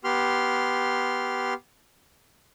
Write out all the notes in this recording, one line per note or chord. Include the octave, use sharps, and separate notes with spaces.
B3 G4 C6 F6